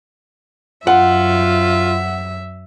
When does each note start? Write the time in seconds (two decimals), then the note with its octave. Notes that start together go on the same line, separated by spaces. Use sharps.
0.87 F#2 F4 E5 F#5